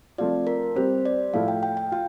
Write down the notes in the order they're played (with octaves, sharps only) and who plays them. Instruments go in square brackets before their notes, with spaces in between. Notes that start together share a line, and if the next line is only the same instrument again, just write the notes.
[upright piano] F3 A3 C4 F4 [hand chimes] D5
[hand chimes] A#4
[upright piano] G3 C4 G4 [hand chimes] C5
[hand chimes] D5
[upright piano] A2 F3 A3 E4 [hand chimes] F5
[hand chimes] G5
G5
G5
[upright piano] F4 [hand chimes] G5